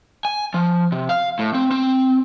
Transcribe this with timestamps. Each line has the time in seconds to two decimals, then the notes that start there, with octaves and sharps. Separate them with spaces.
0.25 G#5
0.54 F3
0.92 C3
1.09 F5
1.39 A2
1.54 C4
1.71 C4